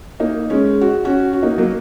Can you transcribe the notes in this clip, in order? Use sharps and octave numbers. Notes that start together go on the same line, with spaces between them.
A#3 D#4
G#3 C#4
F#4
C#4 F#4
F#4
A#3 D#4
F#3 A#3